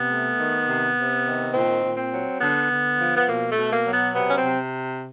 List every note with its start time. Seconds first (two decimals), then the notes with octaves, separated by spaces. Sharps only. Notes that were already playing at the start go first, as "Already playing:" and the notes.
Already playing: C3 B3
0.09 A3
0.38 D#3
0.67 C3
0.96 C3
1.25 D#3
1.53 A#2 C4
1.83 A#2
1.97 C4
2.12 F#3
2.40 D3 B3
2.70 D3
2.99 F3
3.16 B3
3.27 B2 A#3
3.50 A3
3.57 B2
3.71 A#3
3.85 F#3
3.92 B3
4.14 C3 B3
4.29 C#4
4.37 C4
4.43 C3